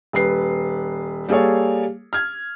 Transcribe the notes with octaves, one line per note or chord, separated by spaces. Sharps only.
D#1 B4 C7
G3 A#3 G#4 A4 C#5
F6 G#6